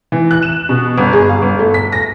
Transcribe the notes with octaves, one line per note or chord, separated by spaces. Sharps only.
E3
F#6
E7
B2
G1
G#4
F5
G1
A3
B6
A#6